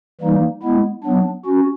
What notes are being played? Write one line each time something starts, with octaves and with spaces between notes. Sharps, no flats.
E3 G3 A#3 D#4
G#3 B3 E4
F#3 B3 D4
C#4 F#4